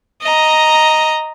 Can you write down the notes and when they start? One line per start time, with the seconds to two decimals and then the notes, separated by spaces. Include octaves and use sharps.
0.22 D#5 A#5